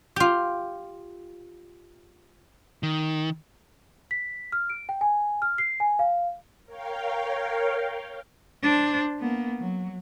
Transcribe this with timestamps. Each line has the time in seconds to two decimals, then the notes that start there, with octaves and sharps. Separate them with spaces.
0.16 F4 G4
2.83 D#3
4.11 B6
4.52 F6
4.70 D7
4.89 G5
5.01 G#5
5.42 F6
5.58 C7
5.80 G#5
5.99 F5
6.65 A#4 C#5 F5 G5
8.63 D4 C5
9.19 A#3 B3
9.59 F#3